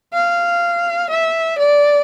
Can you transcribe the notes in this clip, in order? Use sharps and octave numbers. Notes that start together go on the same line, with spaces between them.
F5
E5
D5